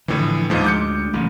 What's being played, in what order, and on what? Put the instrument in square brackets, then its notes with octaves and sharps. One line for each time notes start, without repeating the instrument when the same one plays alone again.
[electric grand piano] A2 E3 [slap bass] D3 F3
[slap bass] D2 G#3 [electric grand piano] G#2 F3
[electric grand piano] D6 G6 C#7
[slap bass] A1 A2 C#3